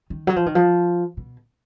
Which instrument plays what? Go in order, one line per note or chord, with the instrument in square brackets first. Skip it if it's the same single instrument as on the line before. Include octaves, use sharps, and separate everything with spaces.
[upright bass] D#3
F#3
F3
D#3
F3
B2